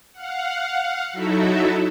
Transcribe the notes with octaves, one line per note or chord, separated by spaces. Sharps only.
F5 F#5
F#3 D#4 E4 F#4 A4 E5